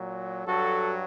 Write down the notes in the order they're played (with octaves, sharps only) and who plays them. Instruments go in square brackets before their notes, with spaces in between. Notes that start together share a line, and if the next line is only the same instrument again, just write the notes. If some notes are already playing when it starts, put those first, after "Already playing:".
Already playing: [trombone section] A#2 F#3
G2 F#3 F#4 A4